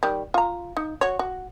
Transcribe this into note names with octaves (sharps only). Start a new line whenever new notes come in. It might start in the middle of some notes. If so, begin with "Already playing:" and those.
D#3 G3
F4 A#5
D#4
F#4 C#5
F#4